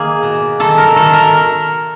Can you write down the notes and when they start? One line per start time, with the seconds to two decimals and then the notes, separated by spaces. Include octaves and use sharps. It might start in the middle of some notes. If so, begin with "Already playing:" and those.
Already playing: D#3 A#3 G#4
0.23 B2
0.60 D#3 A4
0.78 A#4
0.95 D#3 A4
1.13 A#4